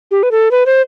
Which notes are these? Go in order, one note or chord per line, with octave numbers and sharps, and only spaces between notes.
G4
B4
A4
B4
C5